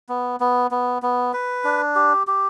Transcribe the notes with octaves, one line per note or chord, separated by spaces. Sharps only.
B3
B3
B3
B3
B4
D4
G4
G4